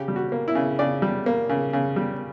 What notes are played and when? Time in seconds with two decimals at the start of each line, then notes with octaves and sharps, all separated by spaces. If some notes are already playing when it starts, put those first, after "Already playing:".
Already playing: C#3 G4
0.08 G3
0.16 F#4
0.32 A#3
0.48 E4
0.55 C#3
0.79 C#3 D5
1.02 G3
1.26 A#3
1.49 C#3
1.73 C#3
1.96 G3